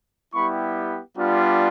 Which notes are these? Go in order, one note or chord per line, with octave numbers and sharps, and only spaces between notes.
G3 B3 E4 G4 B5 C#6
G3 B3 D4 F4